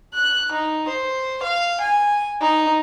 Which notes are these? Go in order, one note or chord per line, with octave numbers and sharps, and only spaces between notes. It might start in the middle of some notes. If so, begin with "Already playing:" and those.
F#6
D#4
C5
F5
G#5
D#4